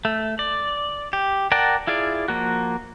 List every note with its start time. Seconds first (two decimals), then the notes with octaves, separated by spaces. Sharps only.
0.05 A3
0.39 D5
1.13 G4
1.52 A#4 D5 F#5 G5 A5
1.87 E4 F4 G#4 D5
2.28 F3 A#3 F#4